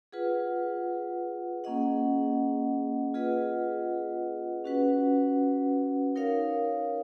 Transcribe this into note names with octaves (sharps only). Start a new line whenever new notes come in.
F4 G#4 B4 F#5
A#3 C#4 G#4 D#5 F#5
F4 G#4 B4 D#5 F#5
C#4 F#4 B4 F#5
D#4 A#4 C#5 F5